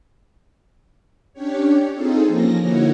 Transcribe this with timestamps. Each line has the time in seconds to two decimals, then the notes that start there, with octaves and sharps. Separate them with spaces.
1.33 C#4 D4 G4 C#5
1.93 C4 D#4 F4 G#4 A4
2.26 F3 A#3 C#4 A#6
2.61 D3 A#3 D#4 E4 F#4 C#5